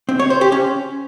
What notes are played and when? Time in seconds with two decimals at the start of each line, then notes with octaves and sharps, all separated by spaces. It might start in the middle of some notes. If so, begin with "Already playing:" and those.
0.09 C4
0.19 C#5
0.30 C5
0.41 G4
0.52 C#4